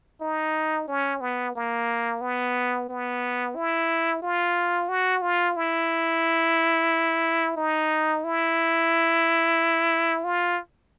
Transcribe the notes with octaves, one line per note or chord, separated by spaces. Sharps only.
D#4
C#4
B3
A#3
B3
B3
E4
F4
F#4
F4
E4
D#4
E4
F4